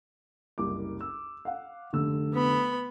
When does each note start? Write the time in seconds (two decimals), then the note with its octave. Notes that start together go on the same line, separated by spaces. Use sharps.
0.58 F#1 C2 D6
1.01 E6
1.45 F5 F#5
1.93 F1 D3 E6
2.33 B3 B5